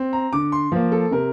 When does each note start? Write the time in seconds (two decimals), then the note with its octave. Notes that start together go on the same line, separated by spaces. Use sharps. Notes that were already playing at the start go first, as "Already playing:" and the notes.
Already playing: C4
0.13 A#5
0.33 D3 D6
0.52 C6
0.72 F3 A#3
0.92 A4
1.11 C3 A#4